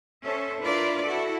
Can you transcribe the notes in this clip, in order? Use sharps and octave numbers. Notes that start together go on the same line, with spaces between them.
C#4 A4 C5 E5
D4 E4 F4 A#4 B4 D5
E4 F#4 A4